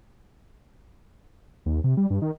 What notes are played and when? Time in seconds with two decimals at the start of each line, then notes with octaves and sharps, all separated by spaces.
1.66 D#2
1.84 C3
1.97 G3
2.10 G2
2.22 D#3